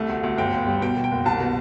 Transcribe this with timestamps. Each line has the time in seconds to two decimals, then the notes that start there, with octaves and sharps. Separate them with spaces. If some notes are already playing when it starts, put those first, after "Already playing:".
Already playing: C2 A3
0.09 D2
0.24 D2
0.38 G1 G5
0.53 G1
0.67 G3
0.82 B2 G5
0.96 B2
1.04 G5
1.11 F#1
1.25 C2 A5
1.40 B2